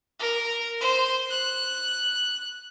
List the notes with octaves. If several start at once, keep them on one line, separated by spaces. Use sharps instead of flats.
A#4
C5
F#6